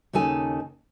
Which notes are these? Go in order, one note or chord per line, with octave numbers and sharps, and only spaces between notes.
D#2 C#3 D#4 A4 G#5